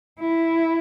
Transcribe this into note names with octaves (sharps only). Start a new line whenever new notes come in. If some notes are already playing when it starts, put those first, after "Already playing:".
E4